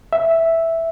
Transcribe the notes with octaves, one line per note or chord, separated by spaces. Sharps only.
E5